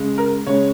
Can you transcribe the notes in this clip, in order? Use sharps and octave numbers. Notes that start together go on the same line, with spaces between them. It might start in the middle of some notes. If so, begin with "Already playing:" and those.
Already playing: C#3 G#3
A#4
C#3 G#3 C#5